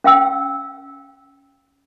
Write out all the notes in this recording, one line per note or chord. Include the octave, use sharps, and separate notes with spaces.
C#4 F5 G5 E6